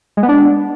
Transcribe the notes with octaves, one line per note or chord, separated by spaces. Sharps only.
G#3
B3
D4